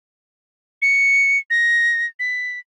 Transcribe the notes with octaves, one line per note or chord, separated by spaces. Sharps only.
C#7
A#6
B6